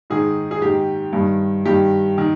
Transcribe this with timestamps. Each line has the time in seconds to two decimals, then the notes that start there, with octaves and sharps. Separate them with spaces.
0.10 G#2 D#3 G#4
0.51 G#4
0.62 G#2 D#3 G4
1.13 G2 D#3
1.65 G2 D#3 G4
2.18 D#3